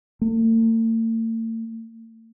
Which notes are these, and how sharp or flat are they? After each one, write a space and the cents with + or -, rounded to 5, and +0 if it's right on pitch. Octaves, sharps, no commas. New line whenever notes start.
A3 +45